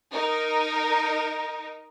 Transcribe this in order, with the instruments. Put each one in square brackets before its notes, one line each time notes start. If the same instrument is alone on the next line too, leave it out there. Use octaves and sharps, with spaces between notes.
[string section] D#4 A#4